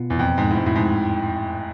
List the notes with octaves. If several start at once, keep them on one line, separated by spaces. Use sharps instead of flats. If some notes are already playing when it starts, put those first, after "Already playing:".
Already playing: B2 B3 F4
E2
F2
G#2
A2
G#2
A2
G#2